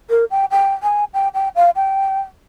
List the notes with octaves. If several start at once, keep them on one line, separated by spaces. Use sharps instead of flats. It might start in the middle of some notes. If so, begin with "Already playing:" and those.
A#4
G5
G5
G#5
G5
G5
F5
G5